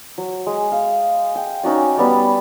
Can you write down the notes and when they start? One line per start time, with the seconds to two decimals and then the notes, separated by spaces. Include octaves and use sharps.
0.18 F#3
0.46 G#3
0.72 F5
1.35 G5
1.63 C#4 D#4 F#4 D5
1.97 G3 B3 D5